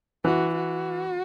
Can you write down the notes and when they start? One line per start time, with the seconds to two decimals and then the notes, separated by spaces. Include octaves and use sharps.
0.24 E3 F#4
0.54 F#4